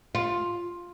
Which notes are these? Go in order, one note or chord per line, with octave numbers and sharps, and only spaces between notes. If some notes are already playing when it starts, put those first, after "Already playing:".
F4